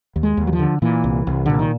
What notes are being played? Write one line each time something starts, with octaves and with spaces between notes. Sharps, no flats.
D#2
G#3
D#2
F#3
F3
D3
A#2 E3
C2
C2
A#2 D3
D#3